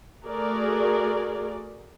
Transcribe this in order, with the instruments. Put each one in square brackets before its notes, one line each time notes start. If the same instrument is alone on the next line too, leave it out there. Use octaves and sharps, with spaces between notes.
[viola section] A3 F#4 G#4 A#4 D5